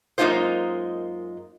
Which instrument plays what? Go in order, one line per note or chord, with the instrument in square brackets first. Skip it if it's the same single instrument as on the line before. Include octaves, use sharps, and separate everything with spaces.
[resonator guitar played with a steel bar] F#2 G#3 A#3 D#4 F4 C5